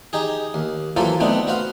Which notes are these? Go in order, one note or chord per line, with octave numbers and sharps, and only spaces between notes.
D#4 G4 G#4
D#2
E3 F#3 A#3 F4 A4 C5
A3 B3 C4 D4 D#4
F#4 B4 C5 F5